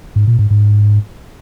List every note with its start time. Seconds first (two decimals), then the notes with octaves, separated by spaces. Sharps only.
0.16 G#2
0.27 A#2
0.39 G#2
0.50 G#2